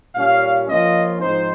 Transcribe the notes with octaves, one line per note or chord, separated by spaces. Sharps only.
A#2 G3 C#4 F5
F3 A#3 C#4 F4 D#5
G#2 F3 C4 D#4 C5